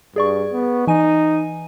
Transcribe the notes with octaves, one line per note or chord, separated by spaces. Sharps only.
G2 G#4 D5 C#6
B3
E3 D#4 G#5 D#7